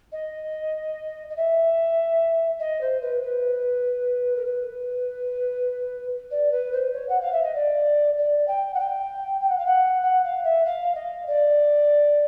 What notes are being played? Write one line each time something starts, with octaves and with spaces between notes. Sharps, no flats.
D#5
D#5
E5
D#5
C5
B4
B4
A#4
B4
D5
B4
C5
C#5
F#5
F5
E5
D#5
D5
D5
G5
F#5
G5
G5
F#5
F5
F#5
F#5
F5
E5
F5
D#5
D5